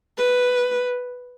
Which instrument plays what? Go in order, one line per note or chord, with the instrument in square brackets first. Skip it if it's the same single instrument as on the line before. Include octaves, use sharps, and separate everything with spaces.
[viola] B4